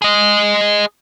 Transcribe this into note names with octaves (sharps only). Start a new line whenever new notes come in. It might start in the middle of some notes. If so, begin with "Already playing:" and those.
G#4 D#5